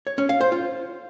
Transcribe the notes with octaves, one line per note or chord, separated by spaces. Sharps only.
C#5
C#4
F5
C5
F4